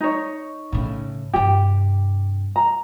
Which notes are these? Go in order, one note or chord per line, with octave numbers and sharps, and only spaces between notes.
D#4 C#5
A2 C#3
G2 C3 G4
A#5